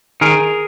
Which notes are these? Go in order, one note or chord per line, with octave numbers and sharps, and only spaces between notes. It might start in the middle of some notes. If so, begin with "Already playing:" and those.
D#3 G#4 A#4